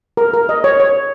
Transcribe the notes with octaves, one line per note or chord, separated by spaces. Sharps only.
A#4
A#4
D#5
C#5
C#5